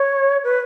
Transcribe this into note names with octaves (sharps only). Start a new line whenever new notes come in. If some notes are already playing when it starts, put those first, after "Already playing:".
Already playing: C#5
B4